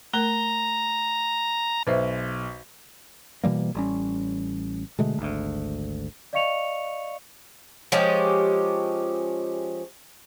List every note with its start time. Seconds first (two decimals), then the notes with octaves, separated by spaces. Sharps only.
0.13 A3 A#4 A#5 G7
1.87 B1 B4 C5 E5
3.44 B2 E3 G3 A#3
3.75 A1 G3 C#4
4.99 B2 D3 G#3 A3
5.18 G#1 D2
6.33 D5 D#5 F5 C#6 C#7 F7
7.92 F3 G#3 C#4 G4